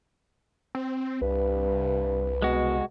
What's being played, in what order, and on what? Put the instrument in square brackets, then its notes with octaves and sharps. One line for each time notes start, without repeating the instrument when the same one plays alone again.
[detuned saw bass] C4
[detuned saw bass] C2 [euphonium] G2 [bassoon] B4
[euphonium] B2 [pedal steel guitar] G#3 F#4